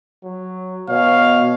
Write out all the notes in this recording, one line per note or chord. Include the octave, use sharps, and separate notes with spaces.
F#3
B2 C#5 F5